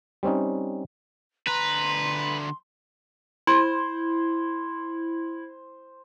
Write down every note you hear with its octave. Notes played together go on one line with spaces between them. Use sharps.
G3 C4 C#4 D#4
D2 B4 A#5 C6
E4 C5